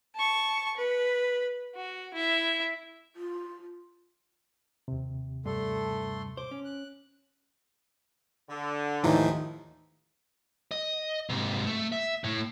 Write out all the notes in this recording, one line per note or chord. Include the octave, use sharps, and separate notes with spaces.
A5 C#6
B4
F#4
E4 E5
F4
D#2 C3
G2 A3 A4 C6
C5 D6
C#4
F#6
D3
D#2 A2 E3 F3 D#4 A#5
D#5
G#2 C3
A3
E5
A2